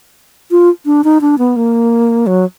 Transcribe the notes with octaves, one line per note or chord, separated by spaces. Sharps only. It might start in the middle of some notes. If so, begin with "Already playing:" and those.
F4
D4
D#4
D4
B3
A#3
F#3